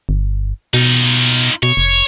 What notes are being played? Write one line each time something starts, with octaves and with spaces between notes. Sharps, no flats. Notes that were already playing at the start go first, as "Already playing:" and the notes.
G1
B2 D#4 F4
B2 C#5
F1